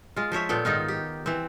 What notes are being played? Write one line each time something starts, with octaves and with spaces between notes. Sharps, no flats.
G#3 F4
F3 C5 C#5 E5
A#2 B3 A4 G5
G#2 D#3 D#4 F4
G4
E3 C4